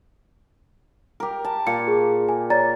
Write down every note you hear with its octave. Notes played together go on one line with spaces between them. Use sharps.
G4 A#4
A5
A#2 C#7
G#4
G#5
C#5 D5 A#5 A6